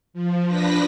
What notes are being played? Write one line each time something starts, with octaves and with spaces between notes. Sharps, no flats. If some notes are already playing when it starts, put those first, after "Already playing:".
F3
F3 D4 B4 A#6 B6